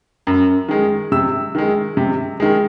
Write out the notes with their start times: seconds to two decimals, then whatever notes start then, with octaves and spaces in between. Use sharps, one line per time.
0.27 F#2
0.69 D#3 G#3
1.12 C3 E6
1.55 D#3 G#3
1.97 C3
2.40 D#3 G#3